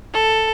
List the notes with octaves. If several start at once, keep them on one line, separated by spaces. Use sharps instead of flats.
A4